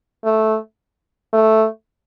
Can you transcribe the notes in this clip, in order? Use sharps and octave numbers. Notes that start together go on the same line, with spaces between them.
A3
A3